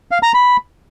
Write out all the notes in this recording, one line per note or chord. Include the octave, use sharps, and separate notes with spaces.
F5
A#5
B5